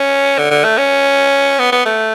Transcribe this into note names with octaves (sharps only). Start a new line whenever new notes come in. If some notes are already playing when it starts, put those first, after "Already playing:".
Already playing: C#4
D3
D3
A3
C#4
B3
B3
A3